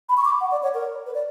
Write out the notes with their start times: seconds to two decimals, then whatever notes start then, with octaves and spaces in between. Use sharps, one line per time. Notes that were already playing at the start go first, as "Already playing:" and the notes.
0.09 B5
0.17 C#6
0.25 D6
0.41 F#5
0.51 D5
0.63 C#5
0.74 A#4
1.06 B4
1.14 D5